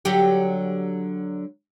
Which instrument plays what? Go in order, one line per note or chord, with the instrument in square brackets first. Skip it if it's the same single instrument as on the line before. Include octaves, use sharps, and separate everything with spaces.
[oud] D3 F#3 G4